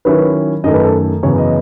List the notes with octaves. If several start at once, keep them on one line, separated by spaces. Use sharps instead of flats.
D#3 F#3 C#4 E4 B4
F#2 D#3 A3 D#5
B4
A4
F#2 C#3 E3 B3 C#5
D#5